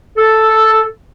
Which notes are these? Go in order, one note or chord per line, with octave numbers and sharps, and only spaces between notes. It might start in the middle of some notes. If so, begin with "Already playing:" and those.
A4